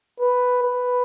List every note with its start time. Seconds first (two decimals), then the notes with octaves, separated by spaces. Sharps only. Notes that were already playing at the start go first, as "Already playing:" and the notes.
0.20 B4
0.63 B4